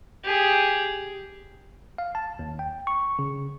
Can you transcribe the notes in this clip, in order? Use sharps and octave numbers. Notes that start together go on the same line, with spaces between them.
G4 G#4
F5
A5
D#2
G5
C#6
C#3